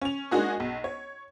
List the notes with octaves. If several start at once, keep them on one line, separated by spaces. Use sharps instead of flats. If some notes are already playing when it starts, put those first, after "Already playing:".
C#4 F7
G#3 A#3 D4 D#4 F#4 G#4
B1
C#5